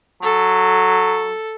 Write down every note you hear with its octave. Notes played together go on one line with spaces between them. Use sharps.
F#3 A4